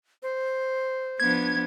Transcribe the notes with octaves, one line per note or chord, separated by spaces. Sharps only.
C5
F3 B3 D4 G#6